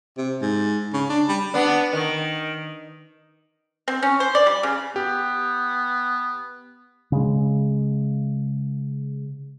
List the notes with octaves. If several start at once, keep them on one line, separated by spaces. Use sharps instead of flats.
C3
G#2
C#3
D4
G3
B3 D4
D#3
C4
C#4
C5
D5
G3
C#3
B3 G4
C#3 G#3